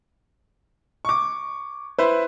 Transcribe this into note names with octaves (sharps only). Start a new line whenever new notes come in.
C#6 D6
E4 B4 C5